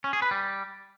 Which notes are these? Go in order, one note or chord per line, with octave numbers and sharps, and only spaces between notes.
C#4
G#4
B4
G3